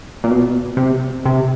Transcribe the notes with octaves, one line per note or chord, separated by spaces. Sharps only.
A#2
B2
C3
C3